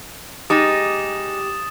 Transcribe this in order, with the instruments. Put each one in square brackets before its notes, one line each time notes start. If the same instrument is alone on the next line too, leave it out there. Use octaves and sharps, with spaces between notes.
[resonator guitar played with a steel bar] G#3 D#4 [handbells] G4 [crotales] D#6 A6 E7